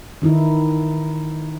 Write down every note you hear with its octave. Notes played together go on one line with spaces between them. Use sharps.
D#3 D#4 E4